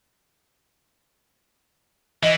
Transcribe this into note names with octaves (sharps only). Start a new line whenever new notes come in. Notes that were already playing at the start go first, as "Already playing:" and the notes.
E3 D#5